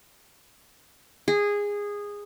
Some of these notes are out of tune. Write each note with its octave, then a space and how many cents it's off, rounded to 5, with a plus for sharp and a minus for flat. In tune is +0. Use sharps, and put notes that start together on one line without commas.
G#4 -15